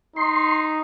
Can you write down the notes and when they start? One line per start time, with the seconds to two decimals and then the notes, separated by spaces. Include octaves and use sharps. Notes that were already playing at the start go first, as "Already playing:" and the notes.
0.16 D#4 C6